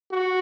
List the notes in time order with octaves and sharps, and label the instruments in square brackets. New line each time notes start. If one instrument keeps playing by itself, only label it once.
[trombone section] F#4